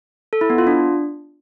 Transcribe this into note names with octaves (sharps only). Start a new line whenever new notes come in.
A4
E4
B3
F4
D4